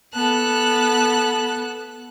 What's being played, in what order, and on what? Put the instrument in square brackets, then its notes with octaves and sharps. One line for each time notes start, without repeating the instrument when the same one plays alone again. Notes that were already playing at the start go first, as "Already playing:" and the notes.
[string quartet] B3 A4 F#6